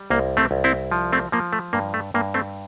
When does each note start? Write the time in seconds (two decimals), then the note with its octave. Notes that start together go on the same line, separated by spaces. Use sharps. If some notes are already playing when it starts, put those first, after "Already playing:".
Already playing: G3
0.10 C2 A#3
0.37 A3 C4
0.51 C2
0.64 C4 E4
0.92 F3
1.13 A3 C4
1.32 F3 A#3
1.53 A3
1.73 G2 A#3
1.94 A3
2.14 G2 A#3
2.34 A3 C4